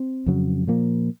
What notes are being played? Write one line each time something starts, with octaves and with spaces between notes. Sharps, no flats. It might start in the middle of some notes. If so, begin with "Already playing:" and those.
Already playing: C4
F2 C#3 F#3
A#2 F3 A#3